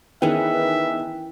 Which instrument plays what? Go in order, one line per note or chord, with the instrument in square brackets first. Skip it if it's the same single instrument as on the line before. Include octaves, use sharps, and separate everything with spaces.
[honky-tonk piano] D#3 B3 G#4 [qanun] E3 C#4 [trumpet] E5 [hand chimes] G5